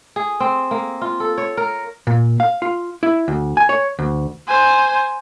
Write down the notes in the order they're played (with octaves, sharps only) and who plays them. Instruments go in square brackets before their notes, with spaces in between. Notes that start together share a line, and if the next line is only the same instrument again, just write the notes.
[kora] G#4
C4
A#3
F4
A4
C#5
A#4
[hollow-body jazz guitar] A#2
F5
F4
E4
D2
G#5
C#5
D2
[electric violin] C5 G#5